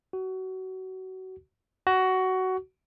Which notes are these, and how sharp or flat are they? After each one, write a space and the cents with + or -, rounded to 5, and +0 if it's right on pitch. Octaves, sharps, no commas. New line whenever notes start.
F#4 +25
F#4 +15